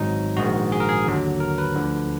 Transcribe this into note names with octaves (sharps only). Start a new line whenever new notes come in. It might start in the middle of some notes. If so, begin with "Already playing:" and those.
Already playing: G#1 G#2 F#3 D#4
A#1 G#2 D#3 F#4
G#4
A#4
G#4
D#2 D3 F#3
A#4
B4
D2 D3 F3